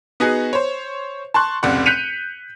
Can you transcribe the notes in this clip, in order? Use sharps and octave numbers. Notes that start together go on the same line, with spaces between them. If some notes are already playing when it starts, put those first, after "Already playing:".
B3 D#4 F#4 G#4
C5 C#5
A5 C6 C#6 F#6
F1 C#2 C3 D5 F#5
F#6 G6 B6 C#7 D#7 F7